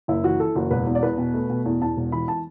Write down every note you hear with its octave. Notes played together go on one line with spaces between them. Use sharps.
F#1 E4
E3 F#4
E3 A4
F#1 F#4
E1 B4
E2
D5
E2 B4
B2
A3
B2
E2
E2 A5
E1
E3 B5
A5